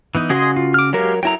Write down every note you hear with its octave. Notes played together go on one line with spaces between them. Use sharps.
E3 B3 D#4
C#3 F#4 G#4 D#5 C6
F4
D6 F6
F#3 G#3 G4 A#4 F5
F#3 E4 A4 A#4 G5 A#5